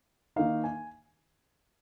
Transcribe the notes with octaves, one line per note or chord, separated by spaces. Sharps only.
D#3 A#3 D#4 F5
G#5